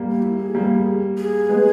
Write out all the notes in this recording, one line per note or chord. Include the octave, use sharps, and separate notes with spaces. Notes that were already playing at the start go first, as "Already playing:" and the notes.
Already playing: G3 A#3
G4
E4
G#4
G3 A#3
G#4
G#3 B3